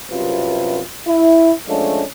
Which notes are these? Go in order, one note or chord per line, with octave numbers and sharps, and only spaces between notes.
C2 F#2 C3 F4 B4
E4
F3 G#3 A3 C#4 D4